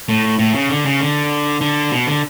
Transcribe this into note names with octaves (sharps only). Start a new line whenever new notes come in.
A2
A2
C#3
D3
C#3
D3
D3
B2
D3